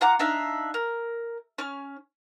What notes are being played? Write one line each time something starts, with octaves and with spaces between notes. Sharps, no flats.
F4 F#5 A#5 D6
D4 D#4 E5 F5
A#4
C#4 F6